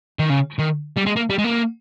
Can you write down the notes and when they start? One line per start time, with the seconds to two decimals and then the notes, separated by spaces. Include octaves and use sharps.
0.19 D#3
0.30 C#3
0.59 D#3
0.97 G3
1.06 G#3
1.16 A#3
1.30 G3
1.38 G#3
1.44 A#3